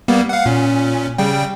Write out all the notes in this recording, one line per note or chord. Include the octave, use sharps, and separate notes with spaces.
G3 A#3 B3
F5 F#5
A#2 C#4
C#3 G3 G5